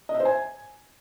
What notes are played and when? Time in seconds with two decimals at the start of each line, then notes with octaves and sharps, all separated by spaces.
0.09 D#5
0.15 E5
0.20 C5
0.25 G#5